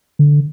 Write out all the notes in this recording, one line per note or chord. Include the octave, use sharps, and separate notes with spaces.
D3